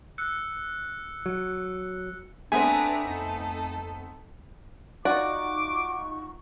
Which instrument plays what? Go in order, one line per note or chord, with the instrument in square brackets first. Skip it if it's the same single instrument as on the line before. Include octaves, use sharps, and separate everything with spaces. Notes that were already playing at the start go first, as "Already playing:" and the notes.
[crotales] E6 F#6 C#7
[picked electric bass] F#3
[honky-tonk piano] A3 B3 C4 [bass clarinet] D4 [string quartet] B4 D5 A#5 [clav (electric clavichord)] G#5
[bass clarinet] F2 [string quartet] D#4 A4
[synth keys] D#4 F4 F#5 [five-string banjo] F#4 D5 [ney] C#6 [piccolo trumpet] D6